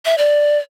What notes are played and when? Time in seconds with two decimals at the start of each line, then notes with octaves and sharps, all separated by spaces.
0.05 E5
0.18 D5